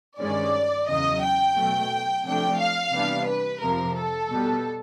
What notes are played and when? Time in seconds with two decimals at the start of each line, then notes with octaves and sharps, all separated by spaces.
0.20 G2 D#3 G#3 C#4 D5
0.89 E2 C#3 F#3 D#5
1.23 G5
1.57 B2 F#3 A3
2.26 C3 F3 A3 D4 G5
2.60 F5
2.94 C3 E3 G3 B3 D4
3.28 B4
3.63 F2 C3 F3 A#4
3.97 A4
4.31 B2 G3 B3